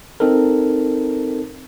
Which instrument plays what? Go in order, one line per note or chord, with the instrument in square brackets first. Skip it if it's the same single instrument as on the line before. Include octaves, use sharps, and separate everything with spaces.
[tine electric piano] C4 D#4 A4 A#4